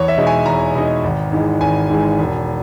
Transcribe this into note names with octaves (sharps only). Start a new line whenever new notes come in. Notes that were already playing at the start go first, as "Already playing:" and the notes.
Already playing: E2 C#5
E5
B2 G#3 D#4
G#5
E2 A#5
B2 G#3 D#4
G#1
G#2 E3 G#3
G#1 G#5
G#2 E3 G#3
E1